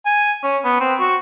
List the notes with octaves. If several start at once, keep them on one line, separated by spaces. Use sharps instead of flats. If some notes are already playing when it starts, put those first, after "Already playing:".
G#5
C#4
B3
C4
F#4